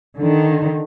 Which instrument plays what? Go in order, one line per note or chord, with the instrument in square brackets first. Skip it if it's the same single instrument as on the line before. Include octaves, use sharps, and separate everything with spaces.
[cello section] D3 D#3